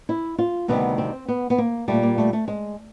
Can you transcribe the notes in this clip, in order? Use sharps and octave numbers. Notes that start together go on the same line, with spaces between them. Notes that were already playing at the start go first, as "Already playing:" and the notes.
E4
F4
D2 C3 D#3 G3 B3
C4
B3
B3
A#3
A#2 G3 A3
A#3
A3
A3
G#3